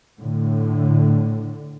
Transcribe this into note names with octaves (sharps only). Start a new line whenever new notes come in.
A2 D3